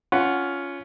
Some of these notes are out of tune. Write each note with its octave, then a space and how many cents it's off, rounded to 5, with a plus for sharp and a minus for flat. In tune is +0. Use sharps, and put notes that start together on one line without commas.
C#4 +15 F4 +0 F#5 +0